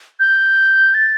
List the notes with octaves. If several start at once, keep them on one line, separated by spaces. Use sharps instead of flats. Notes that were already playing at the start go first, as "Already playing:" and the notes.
G6
A6